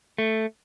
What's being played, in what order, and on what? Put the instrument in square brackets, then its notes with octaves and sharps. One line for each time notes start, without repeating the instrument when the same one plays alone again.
[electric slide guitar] A3